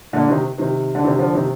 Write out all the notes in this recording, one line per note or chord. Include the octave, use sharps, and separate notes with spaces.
A#2 D3
C3 D#3
C3 D#3
D3
C3 D#3
D3 F3
C3 D#3